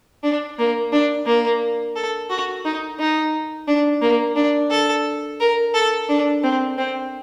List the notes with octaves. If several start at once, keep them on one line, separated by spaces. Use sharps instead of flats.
D4
A#3
D4
A#3
A4
F#4
D#4
D#4
D4
A#3
D4
A4
A#4
A4
D4
C4
C4